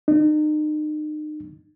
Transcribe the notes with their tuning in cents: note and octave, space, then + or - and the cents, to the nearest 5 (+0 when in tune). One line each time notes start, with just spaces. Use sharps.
D#4 -35